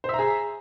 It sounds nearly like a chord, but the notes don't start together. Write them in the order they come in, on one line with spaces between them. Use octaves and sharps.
C5 E5 A#5 G#4